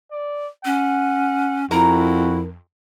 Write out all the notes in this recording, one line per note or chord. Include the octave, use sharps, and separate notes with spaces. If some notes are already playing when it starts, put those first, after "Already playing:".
D5
C#4 F#5
F2 E4 F#4 A#4 A#5